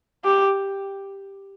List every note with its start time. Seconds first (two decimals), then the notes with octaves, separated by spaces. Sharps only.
0.24 G4